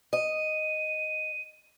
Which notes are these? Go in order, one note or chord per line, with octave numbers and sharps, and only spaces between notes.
D#5 D#7